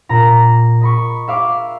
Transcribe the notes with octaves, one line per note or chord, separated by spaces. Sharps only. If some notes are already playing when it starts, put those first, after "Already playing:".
A#2 A#5
D#5 B5 C#6
E5 F5 D6